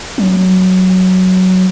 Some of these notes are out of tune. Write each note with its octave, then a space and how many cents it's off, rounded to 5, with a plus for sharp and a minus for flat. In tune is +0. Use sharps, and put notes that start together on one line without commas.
F#3 +5